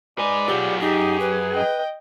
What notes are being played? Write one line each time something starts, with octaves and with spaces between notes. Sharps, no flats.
D#4 G#4 B4 D5
F#3 B3 F4 G4 G#4
F#2 D#4 G4 G#4
B4
D#5 G5